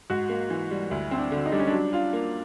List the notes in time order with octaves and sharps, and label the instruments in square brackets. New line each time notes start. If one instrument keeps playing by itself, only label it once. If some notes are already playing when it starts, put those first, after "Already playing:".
[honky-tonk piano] G#2 [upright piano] F#4
[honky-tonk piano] A#3
E3
G3
[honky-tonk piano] D2 [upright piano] E4
[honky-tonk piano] C4
[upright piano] D4
[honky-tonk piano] D3
[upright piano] D#4
[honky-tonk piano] G3 [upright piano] D4
[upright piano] C#4
[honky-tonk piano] F#3 [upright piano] D4
[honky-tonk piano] F4
A#3